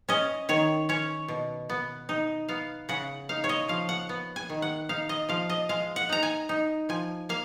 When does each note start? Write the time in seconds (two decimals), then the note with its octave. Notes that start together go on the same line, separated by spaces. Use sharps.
0.09 C#4 D#5
0.49 D#3 C#5
0.89 C#4 C#5
1.28 B2
1.70 B3
2.09 D#4
2.48 B3 F5
2.89 C#3 F#5
3.29 D#4 F5
3.44 C#5
3.49 D#5
3.69 F3 F5
3.89 F#5
4.09 B3
4.36 G#5
4.50 D#3
4.62 F#5
4.89 D#4 F5
5.09 D#5
5.29 F3 F5
5.49 D#5
5.69 G#3 F5
5.96 F#5
6.09 D#4 A#5
6.23 G#5
6.49 D#4
6.89 F3 G#5
7.29 A#3 F5